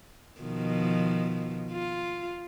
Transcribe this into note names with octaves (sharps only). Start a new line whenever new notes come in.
B2 D#3 F3
F4